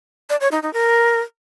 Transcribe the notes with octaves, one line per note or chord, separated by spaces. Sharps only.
D5
C#5
D#4
D#4
A#4